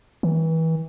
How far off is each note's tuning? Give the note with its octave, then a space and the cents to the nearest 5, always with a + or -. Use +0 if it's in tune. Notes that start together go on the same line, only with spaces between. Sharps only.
E3 -30